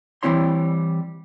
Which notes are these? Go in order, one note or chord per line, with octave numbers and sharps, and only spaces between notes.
E3 G3 C4 E4 C#5 C6